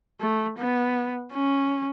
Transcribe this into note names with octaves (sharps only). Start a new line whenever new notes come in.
A3
B3
C#4